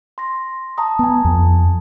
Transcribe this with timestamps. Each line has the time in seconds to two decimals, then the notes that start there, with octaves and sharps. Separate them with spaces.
0.18 C6 A#6
0.78 A5 A#5 D#6
0.99 B3 G#5 A5
1.25 F2